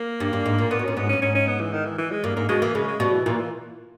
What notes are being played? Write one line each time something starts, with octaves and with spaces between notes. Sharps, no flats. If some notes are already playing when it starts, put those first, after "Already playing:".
Already playing: A#3
G2
G2
G#2
A#2
A#2 B3
B2
A#2 C#4
G#2 B3
C#4
G2
G#2 C#4
C#4
B3
E3
D#3
E3
E3
G#3
G2 A#3
G#2 A#3
B2 G#3
E3 A#3
C#3 G#3
G#3
B2 G3
E3
A#2 E3
E3